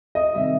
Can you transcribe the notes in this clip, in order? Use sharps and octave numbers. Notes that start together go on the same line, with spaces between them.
D#5
C3 D#3 G3 E5